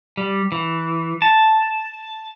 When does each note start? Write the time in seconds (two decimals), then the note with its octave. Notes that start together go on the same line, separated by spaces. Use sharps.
0.17 G3
0.52 E3
1.22 A5